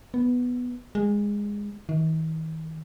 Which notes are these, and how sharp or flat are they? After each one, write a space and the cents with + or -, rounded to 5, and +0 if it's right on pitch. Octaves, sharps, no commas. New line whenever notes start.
B3 +0
G#3 -15
D#3 +45